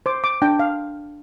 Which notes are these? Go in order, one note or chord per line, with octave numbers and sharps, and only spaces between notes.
C5 D6
D6
D4 G5
F5